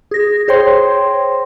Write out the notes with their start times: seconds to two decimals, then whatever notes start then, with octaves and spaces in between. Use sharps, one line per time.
0.11 G#4 A#6
0.48 G#4 C5 C#5 G5 C6